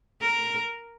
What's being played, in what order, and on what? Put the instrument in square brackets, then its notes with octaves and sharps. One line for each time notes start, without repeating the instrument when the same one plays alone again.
[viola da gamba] A#4